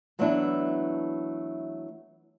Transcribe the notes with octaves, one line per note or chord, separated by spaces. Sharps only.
E3 F#3 A3 B3 D4 E4